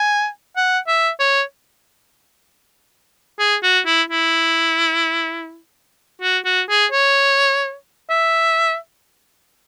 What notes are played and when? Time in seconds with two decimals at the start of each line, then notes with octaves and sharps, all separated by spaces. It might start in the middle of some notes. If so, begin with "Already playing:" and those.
Already playing: G#5
0.56 F#5
0.88 E5
1.20 C#5
3.39 G#4
3.63 F#4
3.86 E4
4.10 E4
6.22 F#4
6.45 F#4
6.69 G#4
6.92 C#5
8.10 E5